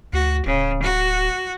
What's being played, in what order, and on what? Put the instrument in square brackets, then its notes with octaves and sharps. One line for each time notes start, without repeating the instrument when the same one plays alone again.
[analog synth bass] D2 [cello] F#4
[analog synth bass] D1 [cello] C#3
[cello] F#4